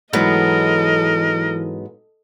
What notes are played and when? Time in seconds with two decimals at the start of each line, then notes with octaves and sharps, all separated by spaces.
0.13 G#2 E3 F#3 B3 A4 A#4 D#5